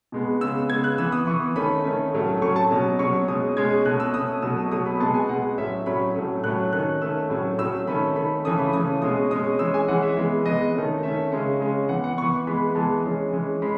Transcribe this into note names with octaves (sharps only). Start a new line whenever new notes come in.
B2 G#3 B3
C#3 G#3 B3 E6
C#3 G#3 B3 G#6
F#6
E3 B3 E6
D#6
E3 B3 C#6
D#3 A3 C#4 B5
D#3 A3 C#4
A2 F#3 A3 C#4
A2 F#3 A3 C#4 C#6
A5
B2 F#3 C#4
B2 F#3 C#4 C#6
B2 G#3 C#4 D#6
B2 G#3 C#4 G#6
B2 A3 C#4 F#6
E6
B2 A3 C#4 D#6
B2 F#3 A3 E6
B2 F#3 A3 D#6
B5
B2 G#3 B3 A5
G#5
B2 G#3 B3 F#5
A2 F#3 C#4 E5
A2 F#3 C#4 B5
A2 F#3 A3 C#4
A2 F#3 A3 C#4 F#6
D#3 A3 C#4 F#6
D#3 A3 C#4 E6
A2 F#3 C#4
A2 F#3 C#4 E6
D#3 A3 C#4 B5
D#3 A3 C#4 B5
C#3 E3 A3 C#4 D#6
B5
C#3 E3 A3 C#4 D#6
B2 G#3 C#4 D#6
B2 G#3 C#4 D#6
E3 G#3 C#4 E6
G#5
E3 G#3 C#4 F#5
E5
E3 G#3 B3
E3 G#3 B3 D#5
D#3 A3 C#4
D#3 A3 C#4 E5
C#3 G#3 C#4
C#3 G#3 C#4
E3 B3 F#5
F#5
E3 B3 C#6
E3 G#3 B3 B5
E3 G#3 B3 A5
E3 G#3 C#4
E3 G#3 C#4
G#3 C#4 B5